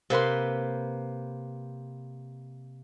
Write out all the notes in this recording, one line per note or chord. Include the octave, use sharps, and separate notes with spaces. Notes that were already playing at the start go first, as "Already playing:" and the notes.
C3 A#3 B4 C6